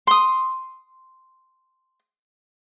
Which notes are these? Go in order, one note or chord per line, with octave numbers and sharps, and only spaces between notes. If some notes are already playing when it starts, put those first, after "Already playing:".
C6 D#6